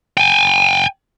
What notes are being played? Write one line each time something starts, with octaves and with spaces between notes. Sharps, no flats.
G5 G#5